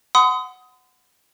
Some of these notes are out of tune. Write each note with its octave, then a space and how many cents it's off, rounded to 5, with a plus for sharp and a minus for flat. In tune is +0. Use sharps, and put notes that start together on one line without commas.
F#5 +0 C6 -45 D#6 +15